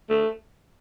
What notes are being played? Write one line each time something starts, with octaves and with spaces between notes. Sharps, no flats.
A3